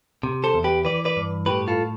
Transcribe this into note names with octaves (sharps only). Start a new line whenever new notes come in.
C3
A4 C5
E2
G4 B4
E3 B4 D5
B4 D5
G2
A2 G4 B4
F4 A4